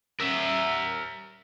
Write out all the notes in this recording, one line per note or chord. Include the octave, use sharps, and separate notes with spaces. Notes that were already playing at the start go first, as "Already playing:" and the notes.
A#4 E5